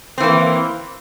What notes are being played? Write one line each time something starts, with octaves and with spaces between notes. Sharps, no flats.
E3 A#3 C4